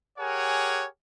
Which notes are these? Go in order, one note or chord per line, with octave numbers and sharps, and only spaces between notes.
G4 G#4 A#4 C#5 F#5 G#5